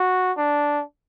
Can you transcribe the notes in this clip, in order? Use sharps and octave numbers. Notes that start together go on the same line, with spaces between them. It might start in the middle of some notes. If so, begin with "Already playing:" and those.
Already playing: F#4
D4